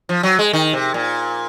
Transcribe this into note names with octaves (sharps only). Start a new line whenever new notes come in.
F3
F#3
G#3
D#3
C3
A#2